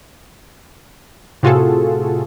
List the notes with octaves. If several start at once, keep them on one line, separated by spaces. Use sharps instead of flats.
A2 C3 F4 F#4 G#4 A4